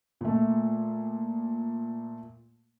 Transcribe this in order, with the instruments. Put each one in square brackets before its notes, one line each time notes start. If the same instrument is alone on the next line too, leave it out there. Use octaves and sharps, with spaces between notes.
[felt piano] A#2 A3